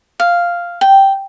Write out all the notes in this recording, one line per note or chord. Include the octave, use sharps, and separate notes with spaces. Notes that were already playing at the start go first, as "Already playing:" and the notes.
F5
G5